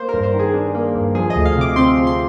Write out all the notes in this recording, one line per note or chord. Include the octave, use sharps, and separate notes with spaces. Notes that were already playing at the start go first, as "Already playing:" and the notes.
Already playing: A#3 C5
A#4
G2
C5
D#3
G#4
D4
A#3
G2
F3 G#4
D#5
D2
F5
C3
D6
C4 C6
F3
C6